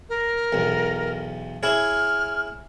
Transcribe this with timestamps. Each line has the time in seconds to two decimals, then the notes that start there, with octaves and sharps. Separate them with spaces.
0.09 A#4
0.53 B1 E2
1.63 E4 G#4 C#5 F6